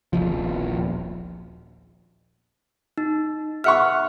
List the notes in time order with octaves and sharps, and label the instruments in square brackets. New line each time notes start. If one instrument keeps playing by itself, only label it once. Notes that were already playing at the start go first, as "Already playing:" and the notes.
[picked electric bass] D#1 A#1 F3
[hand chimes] D#4
[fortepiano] E5 F#5 C#6 [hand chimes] F6